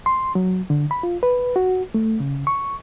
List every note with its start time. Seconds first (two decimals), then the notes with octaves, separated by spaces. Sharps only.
0.06 C6
0.35 F#3
0.70 D3
0.91 B5
1.03 F4
1.23 B4
1.56 F#4
1.94 A3
2.20 C#3
2.47 C#6